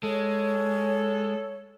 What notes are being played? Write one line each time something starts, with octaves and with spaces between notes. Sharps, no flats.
G#3 A4 C#5